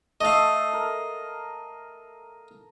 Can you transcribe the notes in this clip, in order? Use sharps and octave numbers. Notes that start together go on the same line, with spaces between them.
A3 A4 D#5 F5
A#4